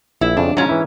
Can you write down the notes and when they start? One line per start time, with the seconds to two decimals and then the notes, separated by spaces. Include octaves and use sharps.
0.21 A#1 E4
0.37 F2 C#3 D4
0.57 G#2 F#3 C#4 F4
0.69 E3 E4